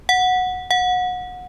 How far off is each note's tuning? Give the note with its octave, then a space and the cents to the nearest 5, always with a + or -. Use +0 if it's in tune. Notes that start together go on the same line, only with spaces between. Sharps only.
F#5 -10
F#5 -25